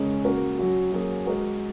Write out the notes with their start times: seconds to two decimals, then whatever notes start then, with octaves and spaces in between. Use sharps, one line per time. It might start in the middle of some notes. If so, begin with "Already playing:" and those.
Already playing: C#3 G#3 C#4 A#4
0.25 C#3 A#3 F#4 A#4
0.59 F#3 C#4 F#4
0.92 F#3 A#3 C#4 G#4
1.26 G#3 F#4 A#4